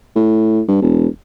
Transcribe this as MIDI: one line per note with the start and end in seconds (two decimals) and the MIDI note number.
0.16 0.62 45
0.68 0.81 43
0.82 1.07 28